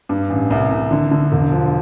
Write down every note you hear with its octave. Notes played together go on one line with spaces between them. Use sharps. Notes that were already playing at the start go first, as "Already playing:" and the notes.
G2
A1
C2
C2
D3
D3
E1
F3